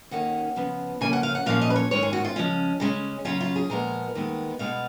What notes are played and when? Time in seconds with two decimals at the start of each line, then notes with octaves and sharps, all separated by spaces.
0.11 D#2 D#3 A#3 C#4 F#5
0.56 C#3 F3 B3
1.01 C#3 F3 A#3 C#4 G#5
1.13 F#5
1.23 F5
1.35 F#5
1.46 A#2 F3 A#3 C#4 F5
1.62 D#5
1.70 B4
1.76 C#5
1.91 G#2 D#3 G#3 C#4 C#5
2.03 G#4
2.13 F#4
2.25 F4
2.36 C#3 F3 G#3 C#4
2.80 C#3 G#3 C#4
3.25 C#3 F#3 C#4 F4
3.40 F4
3.56 G#4
3.70 A#2 F3 G#3 B3 A#4
4.15 D#2 D#3 G#3 B3
4.59 B2 G#3 B3 F5